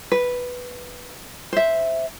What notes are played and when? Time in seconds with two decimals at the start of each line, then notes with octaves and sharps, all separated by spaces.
0.12 B4
1.53 C5 E5